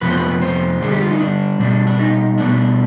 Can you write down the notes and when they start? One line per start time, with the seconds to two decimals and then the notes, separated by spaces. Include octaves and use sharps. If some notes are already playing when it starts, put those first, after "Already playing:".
0.02 F2 C3 F3 B3 B4
0.10 C5
0.17 B4
0.42 C5
0.81 D3 G3 D4 G#4
0.92 G4
1.01 F4
1.11 D#4
1.20 D4
1.59 B2 G3 D4
1.87 D4
1.99 D#4
2.38 B2 G3 B3 D4